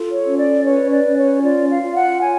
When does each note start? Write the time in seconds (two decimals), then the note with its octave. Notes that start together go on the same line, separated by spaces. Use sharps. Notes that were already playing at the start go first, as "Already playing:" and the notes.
Already playing: F4 A4
0.12 C#5
0.25 C#4
0.38 D5
0.64 B4 C#5
0.91 D5
1.04 C#4
1.17 C#5
1.42 F4 D5
1.70 F5
1.82 F4
1.95 F#5
2.22 C#5 G#5